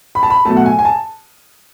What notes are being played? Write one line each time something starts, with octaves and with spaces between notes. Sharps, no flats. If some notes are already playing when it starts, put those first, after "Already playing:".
B5
A5
B5
B2 F#3 A3 A5
F#5
G#5
G#5
A5